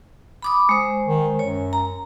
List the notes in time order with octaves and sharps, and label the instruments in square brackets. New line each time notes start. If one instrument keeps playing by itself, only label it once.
[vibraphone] B5 D6 D#6
G#3 C5
[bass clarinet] D#3
[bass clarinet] F#2 [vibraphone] C#5
[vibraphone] A#5